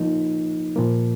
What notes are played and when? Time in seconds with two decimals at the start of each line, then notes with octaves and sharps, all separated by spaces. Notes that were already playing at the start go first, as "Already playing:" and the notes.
Already playing: F3 A#3 D#4
0.76 A#2 F3 A#3